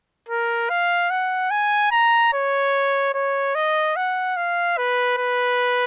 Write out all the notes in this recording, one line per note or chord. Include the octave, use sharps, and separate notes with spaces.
A#4
F5
F#5
G#5
A#5
C#5
C#5
D#5
F#5
F5
B4
B4